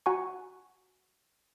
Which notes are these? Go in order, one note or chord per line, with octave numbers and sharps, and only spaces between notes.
F#4 F#5 G#5 A#5 C#6